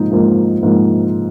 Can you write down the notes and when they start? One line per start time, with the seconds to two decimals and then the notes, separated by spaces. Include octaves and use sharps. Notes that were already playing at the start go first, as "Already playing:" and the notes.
Already playing: G#2 F3 A#3 D#4
0.11 G#2 F3 A#3 D#4
0.63 G#2 F3 A#3 D#4